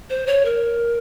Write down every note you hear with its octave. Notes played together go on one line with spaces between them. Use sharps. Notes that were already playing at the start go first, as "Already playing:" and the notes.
C5
C#5
A#4